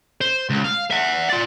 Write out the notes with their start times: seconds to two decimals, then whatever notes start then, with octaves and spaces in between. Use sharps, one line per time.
0.21 C5
0.50 C#2
0.65 F5
0.91 E5 F#5
1.30 F4 D5